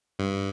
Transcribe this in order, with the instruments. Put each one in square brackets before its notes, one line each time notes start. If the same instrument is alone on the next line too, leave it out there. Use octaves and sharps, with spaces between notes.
[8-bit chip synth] G2